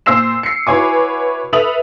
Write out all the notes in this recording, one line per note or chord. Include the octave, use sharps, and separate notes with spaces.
A#2 C5 E6 C7 E7
C7 C#7
E4 F#4 B4 C#5 G#5 D6
A4 B4 E5 D#6 F7 F#7